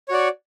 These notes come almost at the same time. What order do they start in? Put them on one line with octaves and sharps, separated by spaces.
C#5 F#4 D5